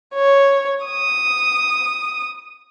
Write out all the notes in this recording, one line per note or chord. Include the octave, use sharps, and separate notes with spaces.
C#5
D#6